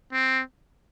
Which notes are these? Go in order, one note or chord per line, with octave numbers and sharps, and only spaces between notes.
C4